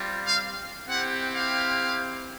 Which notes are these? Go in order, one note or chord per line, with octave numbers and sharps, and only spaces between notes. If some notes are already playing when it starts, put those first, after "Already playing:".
Already playing: G3 C4 F4
F5
C4 E4 G4 F#5
F5